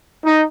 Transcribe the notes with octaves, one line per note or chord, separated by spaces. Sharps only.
D#4